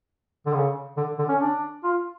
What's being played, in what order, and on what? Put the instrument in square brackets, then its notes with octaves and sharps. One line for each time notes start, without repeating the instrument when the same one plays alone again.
[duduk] D3
C#3
D3
D3
C#4
D4
F4